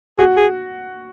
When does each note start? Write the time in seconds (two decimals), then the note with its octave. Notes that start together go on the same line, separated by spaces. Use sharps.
0.19 F#4 G#4
0.37 G#4